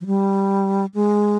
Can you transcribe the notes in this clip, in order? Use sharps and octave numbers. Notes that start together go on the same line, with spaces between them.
F3
G3
G#3